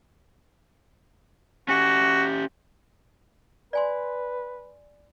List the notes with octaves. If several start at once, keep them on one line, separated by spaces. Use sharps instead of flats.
C#4 F#4 G4
B4 D5 G#5 C6